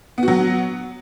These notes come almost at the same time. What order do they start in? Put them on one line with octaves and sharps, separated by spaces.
B3 F#4 F#3